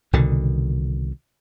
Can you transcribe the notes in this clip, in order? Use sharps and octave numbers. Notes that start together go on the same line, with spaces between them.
C2 B2 D3 D#3